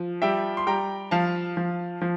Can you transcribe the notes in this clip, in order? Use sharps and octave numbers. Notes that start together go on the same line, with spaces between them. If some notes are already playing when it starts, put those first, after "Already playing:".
Already playing: F3
G3 E5 G5
C6
G3 G5 A#5
F3 F5 A5
F3
F3